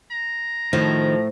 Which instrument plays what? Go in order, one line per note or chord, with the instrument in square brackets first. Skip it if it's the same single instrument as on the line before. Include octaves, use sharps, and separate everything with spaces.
[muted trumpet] A#5
[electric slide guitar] A2 [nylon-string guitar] D#3 [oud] F3